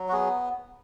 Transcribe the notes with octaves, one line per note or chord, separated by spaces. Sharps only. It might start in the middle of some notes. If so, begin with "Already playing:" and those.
Already playing: F#3
F#4
B3 G#4